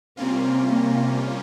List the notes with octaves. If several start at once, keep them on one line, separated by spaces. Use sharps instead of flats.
C3 G3 A#3 C4 C#4 F4
A#3